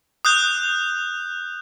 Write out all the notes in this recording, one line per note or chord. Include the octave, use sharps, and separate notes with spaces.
D#6 F#6 G6